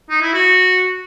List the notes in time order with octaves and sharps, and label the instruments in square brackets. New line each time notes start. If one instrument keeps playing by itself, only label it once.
[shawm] D#4
E4
F#4